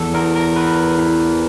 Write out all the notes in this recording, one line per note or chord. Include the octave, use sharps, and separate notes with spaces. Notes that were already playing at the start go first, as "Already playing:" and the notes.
Already playing: E2 A4
E2 A#4
A#4
E2 B4
E3